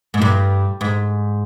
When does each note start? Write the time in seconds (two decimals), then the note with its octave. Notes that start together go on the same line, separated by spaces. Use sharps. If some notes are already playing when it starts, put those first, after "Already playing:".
0.14 G#2
0.22 G2
0.81 G#2